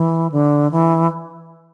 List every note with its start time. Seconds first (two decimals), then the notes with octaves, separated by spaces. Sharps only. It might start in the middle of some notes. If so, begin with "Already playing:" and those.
Already playing: E3
0.32 D3
0.71 E3